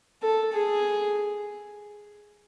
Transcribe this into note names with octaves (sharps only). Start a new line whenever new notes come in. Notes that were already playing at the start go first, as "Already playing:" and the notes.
A4
G#4